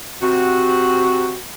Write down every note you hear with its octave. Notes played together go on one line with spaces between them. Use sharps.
C3 F#4